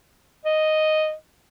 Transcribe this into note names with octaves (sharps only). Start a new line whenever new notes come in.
D#5